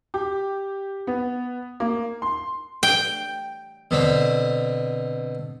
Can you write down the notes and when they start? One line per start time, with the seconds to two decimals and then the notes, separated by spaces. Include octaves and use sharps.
0.14 G4
1.07 B3
1.80 A#3
2.22 C6
2.83 G5
3.91 B2 D3 C4